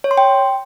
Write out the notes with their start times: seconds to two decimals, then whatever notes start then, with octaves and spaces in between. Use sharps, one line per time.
0.04 C#5
0.11 C6
0.18 G5